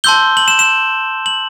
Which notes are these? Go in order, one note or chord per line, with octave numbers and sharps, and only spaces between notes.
A5 C6 E6 G6 G7
F#7
E7
E7
F#7